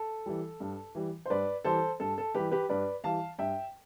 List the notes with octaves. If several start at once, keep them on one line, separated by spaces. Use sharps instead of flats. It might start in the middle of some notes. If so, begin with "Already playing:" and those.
Already playing: A4
E3 G3
G2
E3 G3
C5
G2 B4 D5
E3 G3 A4 C5
G2 A4
A4
E3 G3 G4 B4
G4 B4
G2 B4 D5
E3 G3 F5 A5
G2 E5 G5